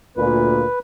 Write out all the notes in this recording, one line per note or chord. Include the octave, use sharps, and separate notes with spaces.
D2 A#2 B4